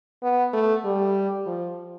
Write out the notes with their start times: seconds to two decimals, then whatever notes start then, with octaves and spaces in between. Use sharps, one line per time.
0.23 B3
0.53 A3
0.85 G3
1.46 F3